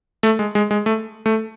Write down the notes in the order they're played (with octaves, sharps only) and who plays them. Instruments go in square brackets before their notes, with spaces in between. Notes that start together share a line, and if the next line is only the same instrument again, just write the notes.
[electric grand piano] A3
G#3
G#3
G#3
A3
A3